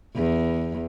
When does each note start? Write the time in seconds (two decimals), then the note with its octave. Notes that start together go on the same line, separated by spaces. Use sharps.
0.15 E2